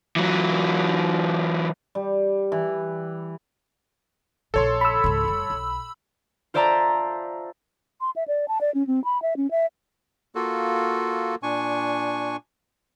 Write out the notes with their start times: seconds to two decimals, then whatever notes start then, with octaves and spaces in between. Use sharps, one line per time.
0.16 E3 F#3
1.95 G3
2.52 E3
4.54 A#1 C#3 A4 C#5 C6
4.81 B5 E6
5.04 C#2 G#2
5.24 F1 G3
5.50 B1
6.54 F4 C5 D5 E5 A5 A#5
8.01 C6
8.16 E5
8.28 D5
8.48 A5
8.61 D5
8.74 C#4
8.87 C4
9.04 B5
9.22 E5
9.37 C#4
9.51 E5
10.35 A#3 F4 F#4 A4
11.43 A#2 D4 G#5 C#6